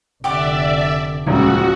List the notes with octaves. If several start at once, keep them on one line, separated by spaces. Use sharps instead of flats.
F1 D3 G4 D5 E5 F#5 D6
D#1 C#2 F3 F#4